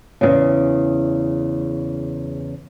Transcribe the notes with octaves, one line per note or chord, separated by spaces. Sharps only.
E2 A#2 C#3